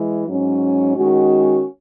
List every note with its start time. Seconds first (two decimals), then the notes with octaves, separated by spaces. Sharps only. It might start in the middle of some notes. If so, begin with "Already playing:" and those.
Already playing: E3 G#3
0.27 G#2 F#3 C#4
0.96 D#3 G#3 C#4 F#4